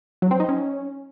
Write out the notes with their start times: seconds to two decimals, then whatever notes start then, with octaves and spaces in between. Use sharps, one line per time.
0.22 F#3
0.31 C4
0.40 D#4
0.49 C#4